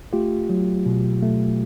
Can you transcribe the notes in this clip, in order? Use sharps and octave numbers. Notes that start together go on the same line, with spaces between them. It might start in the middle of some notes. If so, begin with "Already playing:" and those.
A3 F4 G4
F#3
B2
A3